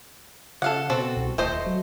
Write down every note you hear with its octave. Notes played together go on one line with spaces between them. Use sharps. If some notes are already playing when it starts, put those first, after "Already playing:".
C#3 A4 F5 F#5
B2 C4 F#4 A4
C2
D#1 A3 C5 D#5
F#3